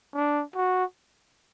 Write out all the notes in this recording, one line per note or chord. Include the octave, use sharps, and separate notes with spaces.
D4
F#4